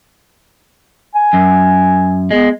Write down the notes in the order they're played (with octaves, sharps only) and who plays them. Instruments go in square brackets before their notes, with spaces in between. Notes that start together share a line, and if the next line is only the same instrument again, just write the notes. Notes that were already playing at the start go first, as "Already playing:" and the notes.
[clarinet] G#5
[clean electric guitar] F#2
[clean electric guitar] G#3 [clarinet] B3